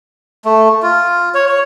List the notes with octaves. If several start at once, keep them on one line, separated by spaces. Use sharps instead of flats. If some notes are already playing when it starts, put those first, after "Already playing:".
A3
F4
C#5
C#5